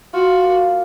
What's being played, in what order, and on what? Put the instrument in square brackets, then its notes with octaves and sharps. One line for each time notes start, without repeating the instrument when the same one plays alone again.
[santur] F4 [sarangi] F#4
[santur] A#3